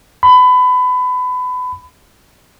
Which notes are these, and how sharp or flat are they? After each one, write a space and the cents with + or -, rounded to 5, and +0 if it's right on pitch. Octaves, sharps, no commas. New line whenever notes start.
B5 +25